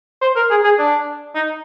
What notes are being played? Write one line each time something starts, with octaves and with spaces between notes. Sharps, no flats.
C5
A#4
G#4
G#4
D4
D#4